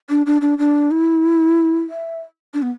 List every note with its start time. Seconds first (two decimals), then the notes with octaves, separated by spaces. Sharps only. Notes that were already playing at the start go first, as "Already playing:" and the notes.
0.10 D4
0.26 D4
0.41 D4
0.58 D4
0.91 E4
1.89 E5
2.54 D4
2.62 B3